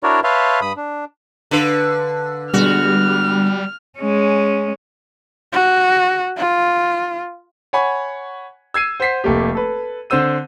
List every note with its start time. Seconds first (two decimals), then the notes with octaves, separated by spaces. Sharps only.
0.03 D4 E4 F#4 A#4 C#5 D5
0.24 B4 C#5 E5 F5 A5 C6
0.61 G2 B5 D#6
0.77 D4
1.51 D3 B4 F5 B6 C#7
2.54 D3 G3 G#3 B3 F#4 F6
3.99 G#3 C#4
5.53 F#4
6.38 F4
7.73 C#5 F#5 G#5 B5 C#6
8.74 E6 G#6 C7 D#7
9.00 C5 F#5 B6 C7
9.24 F1 A3 A#3 G4
9.55 A4 B4
10.10 D3 C4 C5 E6 D#7